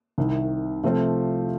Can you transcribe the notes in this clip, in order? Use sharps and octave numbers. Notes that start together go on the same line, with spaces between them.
C2 C3 D#3
C3 F3 A3 C4 F4